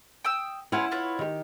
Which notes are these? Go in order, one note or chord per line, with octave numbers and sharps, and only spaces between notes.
G5 D#6 E6
C#4 E4 F4 B4 F#5
F4 B4 C#5
D#3 G4